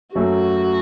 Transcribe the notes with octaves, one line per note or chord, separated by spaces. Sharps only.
F#2 F#3 A3 F#4